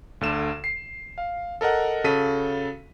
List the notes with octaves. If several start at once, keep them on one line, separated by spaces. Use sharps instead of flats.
D2 D3 E7
C7
F5
A4 A#4 D#5 F#5
C#3 F#4 A4 B6 D#7